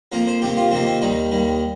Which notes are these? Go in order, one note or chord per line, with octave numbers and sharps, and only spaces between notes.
F2 F3 A#3 A#4
C5
F2 C3 D#3 A#3 G4
F4
F2 C3 D#3 A#3 C4
C4
D#2 D#3 G3 D#4
D#2 D#3 G3